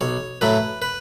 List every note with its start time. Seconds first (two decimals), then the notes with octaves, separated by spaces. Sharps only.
0.01 B1 C#5
0.41 A2 F#3 A3 B4
0.82 B4